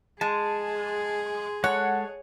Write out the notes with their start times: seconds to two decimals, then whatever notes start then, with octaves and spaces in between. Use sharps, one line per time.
0.21 G#3 G#4 A5
1.64 G#3 A4 C#5 F#5